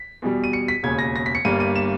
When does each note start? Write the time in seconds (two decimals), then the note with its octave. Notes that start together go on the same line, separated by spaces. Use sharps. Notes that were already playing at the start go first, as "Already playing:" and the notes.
Already playing: B6
0.22 E2 B2 G3
0.44 D#7
0.53 C#7
0.68 B6
0.83 E1 D#2 C#3 G#6
0.99 A#6
1.16 A#6
1.26 B6
1.35 C#7
1.45 G1 G2 G3 A#3 D#7
1.60 D#7
1.76 E7